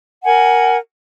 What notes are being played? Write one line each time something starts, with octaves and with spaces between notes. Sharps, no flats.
A#4 F#5 G#5